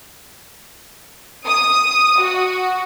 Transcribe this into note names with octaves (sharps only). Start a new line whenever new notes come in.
D#6
F#4